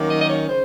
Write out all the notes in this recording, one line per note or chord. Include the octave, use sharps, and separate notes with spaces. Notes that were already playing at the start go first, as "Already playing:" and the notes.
Already playing: D#3 F#3 A#3 C#4
D#5
D#5
C#5
C#3 C5